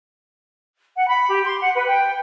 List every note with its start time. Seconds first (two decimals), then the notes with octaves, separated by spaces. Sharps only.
0.96 F#5
1.07 B5
1.29 G4
1.46 C6
1.61 F#5
1.75 B4
1.88 G5